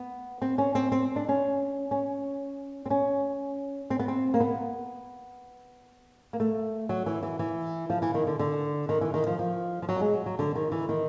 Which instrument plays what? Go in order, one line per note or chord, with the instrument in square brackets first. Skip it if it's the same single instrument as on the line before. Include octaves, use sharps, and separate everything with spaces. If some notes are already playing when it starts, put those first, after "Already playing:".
Already playing: [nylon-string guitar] B3
C4
C#4
C4
C4
D4
C#4
C#4
C4
C#4
C4
B3
C4
A#3
B3
A#3
A3
F#3
E3
E3
E3
F3
E3
D#3
D3
D3
D#3
E3
D#3
F3
F3
F3
F#3
G3
G#3
F#3
F#3
D3
D#3
E3
D#3